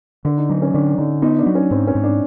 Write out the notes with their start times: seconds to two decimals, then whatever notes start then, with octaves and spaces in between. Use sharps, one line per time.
0.25 D3 D4
0.38 D#4
0.49 F#3 D#4
0.62 C#4
0.74 D3 D4
0.98 D3 D#4
1.22 B3 D#4
1.39 D4
1.46 F#3
1.55 C#4
1.71 G#2 C4
1.87 C#4
1.95 G#2
2.04 D4